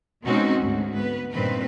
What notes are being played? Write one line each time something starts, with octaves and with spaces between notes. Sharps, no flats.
B2 G#3 C4 C#4 D#4 F#4
D2 G#2
B3 B4
G2 A#2 D#3 C4 B4